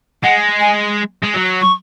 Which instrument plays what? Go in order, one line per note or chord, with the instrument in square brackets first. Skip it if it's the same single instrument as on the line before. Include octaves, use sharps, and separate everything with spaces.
[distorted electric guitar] G#3 [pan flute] F#5
[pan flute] G#5
[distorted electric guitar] G#3
F#3
[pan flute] C#6